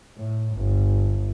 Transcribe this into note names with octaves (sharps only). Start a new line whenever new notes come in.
A2
G1